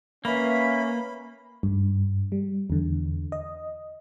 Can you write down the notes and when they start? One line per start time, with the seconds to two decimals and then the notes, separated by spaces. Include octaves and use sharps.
0.25 A#3 C#4 B4 E5 F5 B5
1.63 G2
2.32 G3
2.70 E2 D3
3.32 D#5